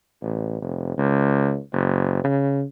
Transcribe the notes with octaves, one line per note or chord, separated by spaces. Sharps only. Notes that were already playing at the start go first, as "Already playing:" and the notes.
A1
F1
C#2
F#1
C#3